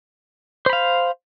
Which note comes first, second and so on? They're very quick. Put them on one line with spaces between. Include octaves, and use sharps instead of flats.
C5 B5 F5